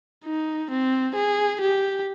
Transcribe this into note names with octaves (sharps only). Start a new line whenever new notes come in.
D#4
C4
G#4
G4